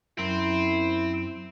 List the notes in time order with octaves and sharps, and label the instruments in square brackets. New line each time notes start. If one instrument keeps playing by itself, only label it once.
[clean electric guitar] F#2 A#4 [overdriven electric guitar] C4 [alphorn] E4